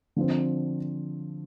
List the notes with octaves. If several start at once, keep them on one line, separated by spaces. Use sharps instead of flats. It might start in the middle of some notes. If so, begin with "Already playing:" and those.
D3 F3 C4